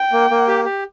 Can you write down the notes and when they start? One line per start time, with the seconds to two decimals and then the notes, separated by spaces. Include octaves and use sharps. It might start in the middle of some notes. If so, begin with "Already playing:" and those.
Already playing: G5
0.12 A#3
0.30 A#3
0.48 G4
0.65 G4